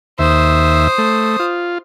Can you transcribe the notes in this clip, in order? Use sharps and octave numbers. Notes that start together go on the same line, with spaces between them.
D#2 C5 E5 D#6
A3
F4